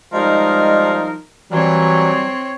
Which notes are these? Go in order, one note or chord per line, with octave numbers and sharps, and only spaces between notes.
F3 G3 G#3 D#4 A#4
E3 F#3 G3 C4 C#5